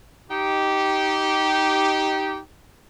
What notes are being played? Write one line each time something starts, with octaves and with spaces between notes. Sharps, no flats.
D#4 G4